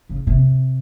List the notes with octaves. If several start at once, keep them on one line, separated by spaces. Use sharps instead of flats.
C#3
C3